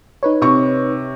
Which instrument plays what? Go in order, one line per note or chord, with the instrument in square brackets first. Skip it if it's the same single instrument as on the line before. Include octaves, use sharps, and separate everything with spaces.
[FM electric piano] D#4 B4 C#5
[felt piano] C3 C#6